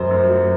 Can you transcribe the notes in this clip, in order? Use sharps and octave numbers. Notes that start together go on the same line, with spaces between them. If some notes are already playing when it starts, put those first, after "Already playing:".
Already playing: F#2 C5
F#2
F#3